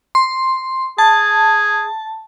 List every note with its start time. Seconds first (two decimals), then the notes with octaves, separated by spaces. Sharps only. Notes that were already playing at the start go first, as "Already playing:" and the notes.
0.15 C6
0.98 G#4 A5